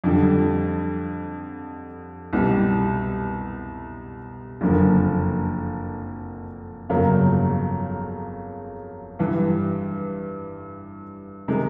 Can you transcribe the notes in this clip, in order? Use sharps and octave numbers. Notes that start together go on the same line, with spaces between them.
F2 D3 G3
C2 B2 G3
F#1 F2 D3 F3 A#3
G1 F2 C#3 F#3 A#3
G2 E3 G3
C3 D#3 G#3